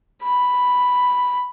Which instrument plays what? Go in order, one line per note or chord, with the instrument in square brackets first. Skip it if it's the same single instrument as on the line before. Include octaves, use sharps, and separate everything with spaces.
[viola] B5